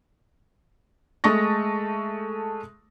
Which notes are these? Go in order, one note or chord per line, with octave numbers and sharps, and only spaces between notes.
G#3 A3 A5 C#6 A#6